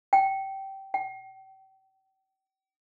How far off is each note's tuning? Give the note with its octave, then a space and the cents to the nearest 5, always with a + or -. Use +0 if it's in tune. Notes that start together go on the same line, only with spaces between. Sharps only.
G5 -20
G5 -40